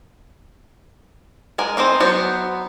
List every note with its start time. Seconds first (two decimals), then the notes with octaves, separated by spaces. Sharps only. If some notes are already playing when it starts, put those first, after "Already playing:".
1.58 G#3 A#4 G#5
1.77 E3 C4 D#4 C5
2.00 F#3 B3 C5